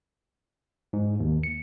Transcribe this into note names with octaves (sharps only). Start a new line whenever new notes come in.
G#2
D#2
C#7